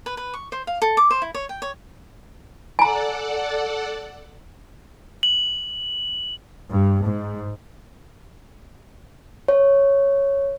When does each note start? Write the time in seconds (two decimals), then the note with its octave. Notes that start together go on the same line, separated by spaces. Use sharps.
0.06 B4
0.17 B4
0.34 C#6
0.52 C5
0.67 F5
0.82 A4
0.97 D6
1.11 C5
1.22 E4
1.34 C#5
1.49 G5
1.62 C#5
2.79 A4 D5 F#5 G#5 A#5
5.23 F#7
6.71 G2
7.04 G#2
9.48 C#5